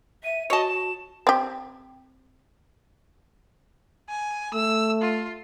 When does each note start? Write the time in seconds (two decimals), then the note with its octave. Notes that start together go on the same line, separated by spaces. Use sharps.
0.24 E5 D#7
0.50 F#4 C#5 D#5 A5
0.68 E7
1.27 C4 G4
4.09 G#5
4.54 A3 E6
5.02 F4